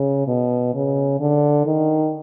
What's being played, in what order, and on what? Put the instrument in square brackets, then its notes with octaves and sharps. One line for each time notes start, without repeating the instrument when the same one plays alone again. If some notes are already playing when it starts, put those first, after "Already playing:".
Already playing: [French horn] C#3
B2
C#3
D3
D#3